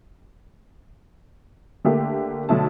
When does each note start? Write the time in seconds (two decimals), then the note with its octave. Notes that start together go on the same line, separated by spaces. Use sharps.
1.84 D3 A3 A#3 G4
2.49 B1 D3 A3 A5